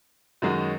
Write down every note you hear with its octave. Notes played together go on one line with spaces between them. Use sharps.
F#2 D#3 G#3 D#4 F#4